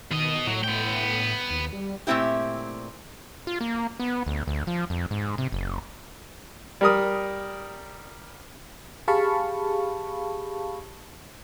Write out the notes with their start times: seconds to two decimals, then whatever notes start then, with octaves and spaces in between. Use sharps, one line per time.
0.11 B2 D#3 D#5
0.47 A2 F#3
0.64 B3 G5
1.50 D#2
1.73 G3
2.07 A#2 A3 C4 E4 G4
3.47 F4
3.61 A#3
4.00 B3
4.27 D2
4.47 D2
4.67 F3
4.90 F2
5.11 G#2
5.38 C3
5.52 F#1
6.81 G3 A#4 D#6
9.08 G4 G#4 F5 A5 B5 C#6